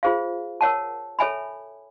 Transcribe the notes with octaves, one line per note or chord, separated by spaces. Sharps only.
F4 G#4 C5 F5
A#4 C#5 F#5 A5
A4 C#5 E5 G#5 B5